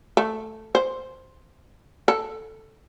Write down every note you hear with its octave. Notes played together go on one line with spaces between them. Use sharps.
A3
C5
A4